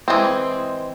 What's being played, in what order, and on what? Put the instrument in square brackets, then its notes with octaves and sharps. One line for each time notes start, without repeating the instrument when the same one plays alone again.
[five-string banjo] E3 G#3 C4